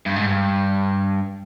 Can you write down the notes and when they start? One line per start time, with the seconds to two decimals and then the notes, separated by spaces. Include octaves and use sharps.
0.06 G2
0.16 G#2
0.26 G2